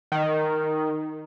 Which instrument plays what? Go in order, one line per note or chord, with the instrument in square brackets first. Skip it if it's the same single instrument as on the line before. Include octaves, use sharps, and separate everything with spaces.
[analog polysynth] D#3